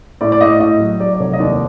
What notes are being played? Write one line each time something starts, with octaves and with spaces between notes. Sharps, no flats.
A2 D5
D5
A2 D#5
A2 D#5
F#3
F#3 D5
D5
F1 C#5
D#5
D#2 D5